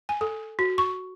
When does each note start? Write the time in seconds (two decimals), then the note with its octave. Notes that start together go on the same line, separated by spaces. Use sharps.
0.09 G#5
0.21 A4
0.59 F#4
0.78 C#6